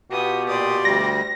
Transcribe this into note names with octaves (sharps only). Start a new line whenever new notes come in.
B2 B3 F4 G4 D#6
A#2 D5 C6 D#6
D2 G3 A#6